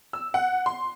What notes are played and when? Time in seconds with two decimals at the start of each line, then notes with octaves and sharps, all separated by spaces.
0.13 E6
0.34 F#5
0.66 C6